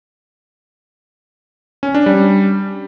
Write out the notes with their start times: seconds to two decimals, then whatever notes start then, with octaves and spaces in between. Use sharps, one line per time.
1.83 C#4
1.94 D4
2.06 G3